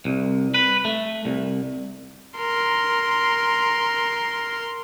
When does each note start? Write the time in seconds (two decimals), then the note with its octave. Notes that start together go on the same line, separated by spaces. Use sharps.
0.05 C2
0.54 B4
0.85 A3
1.25 C2
2.38 A#4 C6